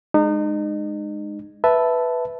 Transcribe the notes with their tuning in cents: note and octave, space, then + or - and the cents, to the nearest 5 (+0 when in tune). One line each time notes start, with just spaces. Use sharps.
G#3 +0 D#4 -35
B4 +0 E5 +0 A5 +0